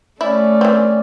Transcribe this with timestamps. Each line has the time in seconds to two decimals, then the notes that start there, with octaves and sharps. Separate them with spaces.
0.21 A3 C#4 E4 D5
0.61 E3 C4